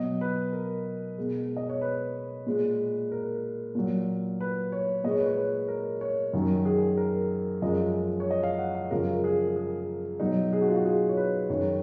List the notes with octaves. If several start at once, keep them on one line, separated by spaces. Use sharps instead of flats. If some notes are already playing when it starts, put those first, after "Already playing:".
Already playing: B2 F#3 D#5
B4
A#4
B2 G#3
D#5
C#5
B4
A#2 G#3
A#4
A#2 F#3
B4
C#5
A#2 G#3 D#5
C#5
B4
C#5
B4
A#4
C#5
F#2 D#3 F#3
G#4
A#4
F#2 F3 G#3 D#5
C#5
D#5
F5
F#5
F5
F#2 C#3 F3 G#3 A#4
G#4
G#4
B2 F#3 D#4
G#4
F#4
F4
F#4
G#4
C#5
B4
F#2 D#3 G#3 C#5